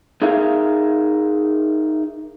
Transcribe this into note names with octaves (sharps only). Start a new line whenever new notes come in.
D#4 G#4 A#4 E5 F5